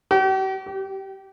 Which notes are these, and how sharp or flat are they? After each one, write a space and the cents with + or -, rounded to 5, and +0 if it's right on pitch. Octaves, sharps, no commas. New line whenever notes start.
G4 -45
G4 -20